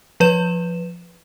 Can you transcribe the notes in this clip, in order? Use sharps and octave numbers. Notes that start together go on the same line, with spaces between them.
F3 B4 E7